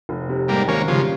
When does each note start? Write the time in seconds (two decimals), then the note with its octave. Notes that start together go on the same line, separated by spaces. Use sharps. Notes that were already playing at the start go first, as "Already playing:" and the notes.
0.09 F1
0.29 C3
0.48 G#2 G3 A#3
0.68 G#1 A#3 C#4
0.87 C#3 F3 G3